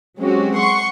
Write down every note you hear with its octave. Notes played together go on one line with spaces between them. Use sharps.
F#3 G#3 C4 C#4 F#4 G4
F#5 C6 C#6